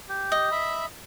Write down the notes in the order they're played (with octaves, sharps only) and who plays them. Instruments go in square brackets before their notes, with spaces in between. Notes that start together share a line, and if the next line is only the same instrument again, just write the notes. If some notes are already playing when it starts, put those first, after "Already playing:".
[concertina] G4
[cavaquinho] D#5
[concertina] E5 B5